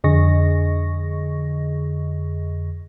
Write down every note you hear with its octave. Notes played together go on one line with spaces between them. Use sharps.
F2 D3 G#4 D#5 C#6 A#6